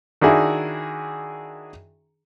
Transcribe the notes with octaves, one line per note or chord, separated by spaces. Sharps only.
D#3 D4 E4 F#4 G#4